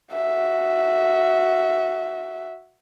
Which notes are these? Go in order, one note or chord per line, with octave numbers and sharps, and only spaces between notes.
F#4 E5